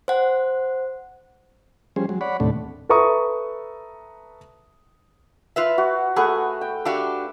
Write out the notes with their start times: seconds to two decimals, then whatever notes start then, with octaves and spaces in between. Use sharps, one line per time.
0.08 C5 F#5
1.96 F3 G3 C#4 G#4 C5
2.09 F#3 G#3
2.21 C#5 D5 F#5 B5
2.40 D#2 A2 C3 A3 D4
2.89 A4 B4 E5 A#5 C#6 D#6
5.56 F4 B4 E5
5.78 F#4
6.16 A3 G#4 B4 F#5
6.61 G5
6.85 D4 F#4 G4 E5 F5